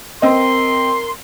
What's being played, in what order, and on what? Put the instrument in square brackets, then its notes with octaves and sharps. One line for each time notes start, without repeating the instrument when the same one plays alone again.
[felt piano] C4 D#5 [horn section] A#4 C6